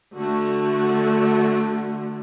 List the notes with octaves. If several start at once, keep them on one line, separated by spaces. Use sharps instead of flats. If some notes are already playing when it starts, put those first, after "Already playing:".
D3 A3 F#4